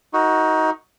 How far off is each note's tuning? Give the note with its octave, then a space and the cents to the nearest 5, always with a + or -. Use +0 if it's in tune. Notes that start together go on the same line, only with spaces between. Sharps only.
D#4 +20 F#4 +0 A#4 -10